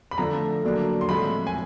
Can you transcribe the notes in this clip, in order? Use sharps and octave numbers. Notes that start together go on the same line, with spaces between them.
B5
D3 F3 A3 D4 A#5
D3 F#3 A#3 D4
C6
A2 F3 G#3 C4 B5
G#5